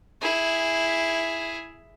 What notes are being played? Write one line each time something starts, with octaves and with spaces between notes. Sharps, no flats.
E4 G#4